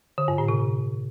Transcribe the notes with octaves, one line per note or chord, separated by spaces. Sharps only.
D3
G2
A2
C3